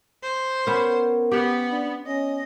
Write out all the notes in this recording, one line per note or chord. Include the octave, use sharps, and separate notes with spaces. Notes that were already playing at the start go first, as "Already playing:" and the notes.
C5
B3 C#4 A#4
B3 G4 F#5
D4
C#4 D#5